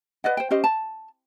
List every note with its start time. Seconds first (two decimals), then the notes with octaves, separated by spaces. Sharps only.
0.24 B4 D5 D#5 F#5
0.37 C5 G5
0.51 C#4 G4 C5 D#5
0.64 A5